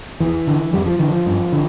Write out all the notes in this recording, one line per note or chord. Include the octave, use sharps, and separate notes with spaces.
E2 E3
D3
F2 G3
F3
D3 E3
F3
G2
D3